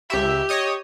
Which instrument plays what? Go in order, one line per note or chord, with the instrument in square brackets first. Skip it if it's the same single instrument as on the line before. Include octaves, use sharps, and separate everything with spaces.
[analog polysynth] C#2 E5 [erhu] G4
[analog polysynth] C#5 D#5 D#6